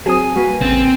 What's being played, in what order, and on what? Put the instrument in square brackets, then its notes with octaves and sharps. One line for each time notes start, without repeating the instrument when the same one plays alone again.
[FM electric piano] F#3 C4 D#6 [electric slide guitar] G#4 A5 [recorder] G#5
[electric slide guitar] G3 A#3 B4 [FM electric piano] F#4
[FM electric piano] A1 C#3 A6 [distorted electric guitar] C4